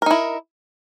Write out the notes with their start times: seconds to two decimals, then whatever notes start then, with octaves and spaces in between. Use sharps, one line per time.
0.02 A#4
0.06 D#4
0.11 E4